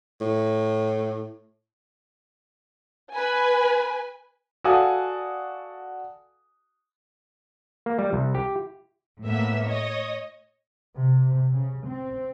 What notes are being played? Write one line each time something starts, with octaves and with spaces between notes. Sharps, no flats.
A2
B4 G#5
F#4 A4 D5 F5 G#5 D#6
A#3
G3
C2
G4
A2 A#3 B3 E5
C#5 D#5
C3
C#3
C4